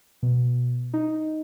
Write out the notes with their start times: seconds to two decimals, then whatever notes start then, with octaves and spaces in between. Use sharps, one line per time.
0.23 B2
0.94 D#4